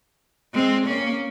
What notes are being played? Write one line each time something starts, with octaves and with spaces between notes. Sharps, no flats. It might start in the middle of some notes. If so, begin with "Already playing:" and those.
G#3 C4
A#3 C#4